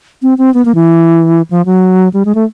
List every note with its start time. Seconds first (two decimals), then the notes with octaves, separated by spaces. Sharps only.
0.22 C4
0.38 C4
0.54 B3
0.65 A#3
0.75 E3
1.50 F3
1.65 F#3
2.13 G3
2.25 G#3
2.35 A3